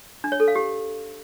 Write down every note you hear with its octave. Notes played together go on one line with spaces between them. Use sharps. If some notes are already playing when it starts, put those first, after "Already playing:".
D4
C#5
A4
F5
G4